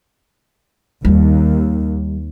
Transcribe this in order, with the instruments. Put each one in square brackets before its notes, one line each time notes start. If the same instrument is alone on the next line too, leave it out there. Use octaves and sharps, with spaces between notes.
[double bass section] D#2 [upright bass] G3